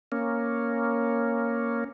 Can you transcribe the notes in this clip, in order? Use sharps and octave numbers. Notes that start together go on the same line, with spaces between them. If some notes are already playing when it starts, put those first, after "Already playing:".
A#3 C#4